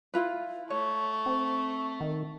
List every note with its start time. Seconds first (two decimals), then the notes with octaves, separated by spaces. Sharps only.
0.14 E4 F4 B4
0.70 A3 C#5 C#6
1.26 C4
2.01 D#3